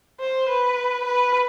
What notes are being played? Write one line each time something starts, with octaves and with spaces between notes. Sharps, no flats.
C5
B4
B4